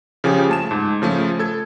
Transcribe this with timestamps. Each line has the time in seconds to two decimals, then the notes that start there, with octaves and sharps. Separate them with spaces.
0.24 C#3 F3 G4 G#4
0.49 A3 A5 E7
0.71 G#2
1.02 C#3 F3 A3
1.39 A4 G#6